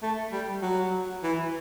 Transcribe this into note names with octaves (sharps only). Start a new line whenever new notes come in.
A3
G3
F#3
E3